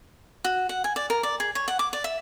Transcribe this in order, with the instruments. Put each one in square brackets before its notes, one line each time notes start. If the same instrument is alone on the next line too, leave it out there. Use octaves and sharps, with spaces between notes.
[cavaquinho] F#4
F#5
G#5
D5
A#4
D5
G#4
C#5
F#5
D6
D5
E5